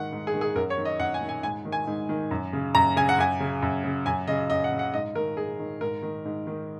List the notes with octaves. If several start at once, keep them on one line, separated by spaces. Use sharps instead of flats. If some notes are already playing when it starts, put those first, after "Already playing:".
Already playing: G#2 D#3 F#5
G#2
G#4
D#3
G#4
F#2 A#4
C#5
D#3
D#5
F#2 F#5
G#5
D#3
G#5
G#2 G#5
D#3
G#5
G#2
D#3
F#2
C#3
F#2 A#5
C#3 G#5
F#5
F#2 G#5
C#3
F#2
C#3
F#2 G#5
C#3 D#5
F#2 D#5
F#5
C#3
F#5
G#2 D#5
D#3 A#4
G#2 G#4
D#3
G#2 A#4
D#3
G#2
D#3